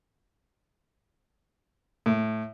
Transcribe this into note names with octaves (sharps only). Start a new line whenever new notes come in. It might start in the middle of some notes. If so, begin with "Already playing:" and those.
A2